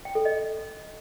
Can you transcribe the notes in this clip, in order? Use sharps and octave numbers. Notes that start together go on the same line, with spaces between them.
G5
A4
D#5